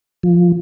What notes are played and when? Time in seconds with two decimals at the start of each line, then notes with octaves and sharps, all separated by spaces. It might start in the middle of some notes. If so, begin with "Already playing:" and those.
0.23 F3